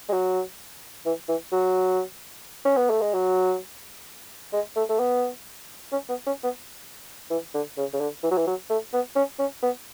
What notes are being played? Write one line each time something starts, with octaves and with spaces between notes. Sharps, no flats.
G#3
F#3
E3
E3
F#3
C#4
B3
A3
G#3
F#3
G#3
A3
A3
B3
C#4
B3
C#4
B3
E3
D3
C#3
C#3
D3
E3
F#3
E3
F#3
A3
B3
C#4
C#4
B3